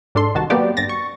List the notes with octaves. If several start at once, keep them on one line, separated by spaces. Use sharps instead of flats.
G#2 D4 A4 C6
C2 D#3 F#4 A5
F#3 A#3 B3 F#4 G4 D5
G1 A6 A#6
C#6